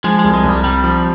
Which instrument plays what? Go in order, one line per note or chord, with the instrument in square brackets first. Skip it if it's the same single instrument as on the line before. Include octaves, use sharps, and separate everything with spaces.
[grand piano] F3 [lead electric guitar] G#3
[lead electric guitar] G#3
[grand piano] C2
[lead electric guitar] G#3
[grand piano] C2 [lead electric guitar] G3
[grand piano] C3 [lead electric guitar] G3
[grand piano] F3